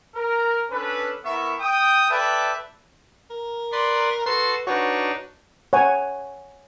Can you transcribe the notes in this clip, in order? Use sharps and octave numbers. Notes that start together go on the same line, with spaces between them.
A#4
C#4 D4 A4 B4
B3 E4 A#4 E5 C#6
G5 D#6
A4 B4 D5 E5 G5 A5
A#4
B4 D5 C6
F#4 A4 B4 C6
D4 D#4 F#4 B4 C#5
C#5 F#5 G#5